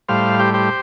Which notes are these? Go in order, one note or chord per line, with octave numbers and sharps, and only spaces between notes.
A2 G3 C5 F5
G4 C5
G4 C5